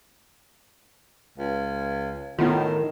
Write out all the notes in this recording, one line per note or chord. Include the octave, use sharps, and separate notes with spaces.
C#2
A2 D#3 B3 E4 F4